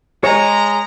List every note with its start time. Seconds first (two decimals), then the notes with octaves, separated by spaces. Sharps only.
0.24 G#3 C#5 A#5